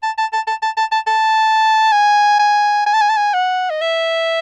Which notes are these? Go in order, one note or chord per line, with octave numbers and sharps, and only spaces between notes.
A5
A5
A5
A5
A5
A5
A5
A5
G#5
G#5
G#5
A5
G#5
A5
G#5
F#5
D#5
E5